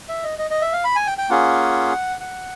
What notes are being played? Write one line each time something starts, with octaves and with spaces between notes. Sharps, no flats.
E5
D#5
D#5
D#5
E5
F5
B5
G#5
G5
G5
A#3 C#4 F4 G#4 F#5
F#5